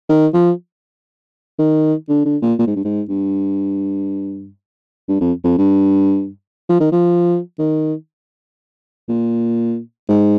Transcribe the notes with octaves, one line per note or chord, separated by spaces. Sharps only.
D#3
F3
D#3
D3
D3
A#2
A#2
G#2
G2
G#2
G2
G2
F2
F2
G2
F3
D#3
F3
D#3
A#2
G#2